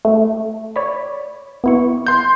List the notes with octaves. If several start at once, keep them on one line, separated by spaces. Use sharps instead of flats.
A3
C#5 D5 B5
B3 E4 C#6
C6 G6